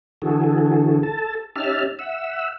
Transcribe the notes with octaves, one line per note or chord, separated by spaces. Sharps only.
D3 E3 F#4 G#4 A4
A4 A5
C#4 D#4 G4 E5 A5 F6
E5 F#5 E6